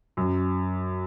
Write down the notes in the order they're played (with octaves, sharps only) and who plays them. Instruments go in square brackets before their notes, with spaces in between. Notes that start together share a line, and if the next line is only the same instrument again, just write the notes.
[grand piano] F#2